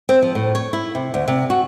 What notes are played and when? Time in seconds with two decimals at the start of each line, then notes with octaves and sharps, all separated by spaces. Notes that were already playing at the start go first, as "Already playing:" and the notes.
0.09 C4
0.22 F3
0.35 A2
0.55 C#5
0.73 E4
0.95 C3
1.14 D2
1.28 C3
1.50 F#4